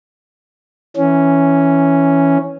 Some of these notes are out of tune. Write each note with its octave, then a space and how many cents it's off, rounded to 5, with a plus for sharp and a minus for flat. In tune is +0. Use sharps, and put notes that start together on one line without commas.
E3 +0 C#4 +0